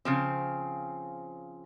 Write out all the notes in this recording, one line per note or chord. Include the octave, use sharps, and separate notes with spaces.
C#3 F3 C4